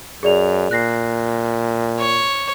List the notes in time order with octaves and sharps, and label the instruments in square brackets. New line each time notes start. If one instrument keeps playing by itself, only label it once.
[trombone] F#2 [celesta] G#4 D5 F7
[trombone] A#2 [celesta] F#6 A#6 C7
[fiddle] C#5